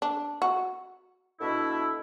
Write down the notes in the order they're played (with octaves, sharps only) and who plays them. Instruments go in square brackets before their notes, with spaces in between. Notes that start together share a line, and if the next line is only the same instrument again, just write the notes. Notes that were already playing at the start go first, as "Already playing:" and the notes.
[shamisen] D4
F#4
[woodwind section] B2 D3 E4